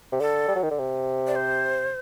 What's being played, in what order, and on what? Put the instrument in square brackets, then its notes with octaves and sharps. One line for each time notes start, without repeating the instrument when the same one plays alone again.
[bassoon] C3
[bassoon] D3 [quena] A4
[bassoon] G3
F#3
D#3
D3
C3
[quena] D5
C5